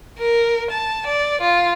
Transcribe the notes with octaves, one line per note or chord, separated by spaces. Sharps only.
A#4
A5
D5
F4